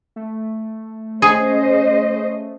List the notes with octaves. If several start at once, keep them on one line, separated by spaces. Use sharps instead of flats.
A3
C#4 G#4 C5 D#5